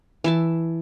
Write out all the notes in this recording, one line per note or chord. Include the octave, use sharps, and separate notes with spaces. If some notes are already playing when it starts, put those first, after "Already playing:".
E3 E5 A5